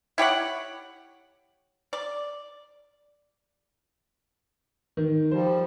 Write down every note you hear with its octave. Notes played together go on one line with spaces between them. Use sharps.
E4 G4 C#5 F#5
D5
D#3
F3 G3 C5
B5